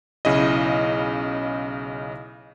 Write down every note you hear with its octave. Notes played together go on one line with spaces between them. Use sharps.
B1 C#3 E4 D#5